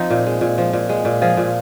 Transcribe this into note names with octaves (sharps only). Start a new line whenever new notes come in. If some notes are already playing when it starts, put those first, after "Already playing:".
Already playing: F3 C4 D#4
A#2
G#3
A#2
F3
A#2
G#3
A#2
F3 F4 G#4
A#2